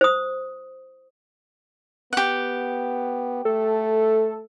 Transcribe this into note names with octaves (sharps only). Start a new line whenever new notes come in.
C5 D#6
B3 G4 F#5
A3 A4